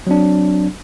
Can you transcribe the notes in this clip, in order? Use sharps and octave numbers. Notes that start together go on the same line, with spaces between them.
F#3 C4 D4